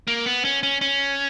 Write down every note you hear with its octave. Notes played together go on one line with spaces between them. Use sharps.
A#3
B3
C#4
C#4
C#4